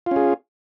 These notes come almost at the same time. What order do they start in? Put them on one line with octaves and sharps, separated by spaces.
F4 C#4 G#4